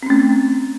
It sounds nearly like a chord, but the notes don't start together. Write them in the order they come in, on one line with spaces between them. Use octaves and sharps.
C4 C#4 A3